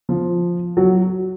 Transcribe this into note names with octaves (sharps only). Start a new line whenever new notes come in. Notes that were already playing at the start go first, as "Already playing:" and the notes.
F3
F#3